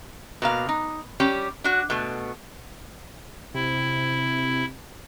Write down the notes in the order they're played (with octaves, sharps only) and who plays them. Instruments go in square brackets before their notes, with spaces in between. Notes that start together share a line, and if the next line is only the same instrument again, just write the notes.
[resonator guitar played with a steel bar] B2 A#3 F5
D#4
G3 C#4 G4
D4 F#4
B2 A3
[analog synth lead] C3 [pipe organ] E4